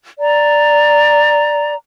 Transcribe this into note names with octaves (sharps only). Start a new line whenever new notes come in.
D5 A#5